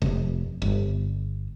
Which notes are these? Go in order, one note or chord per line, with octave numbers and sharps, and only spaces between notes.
F1
G1